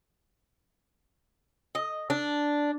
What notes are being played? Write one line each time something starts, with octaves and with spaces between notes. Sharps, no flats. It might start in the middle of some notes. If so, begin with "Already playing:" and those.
D#5
D4